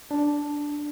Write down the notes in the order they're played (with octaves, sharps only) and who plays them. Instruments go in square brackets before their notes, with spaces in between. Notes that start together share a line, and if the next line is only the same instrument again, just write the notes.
[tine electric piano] D4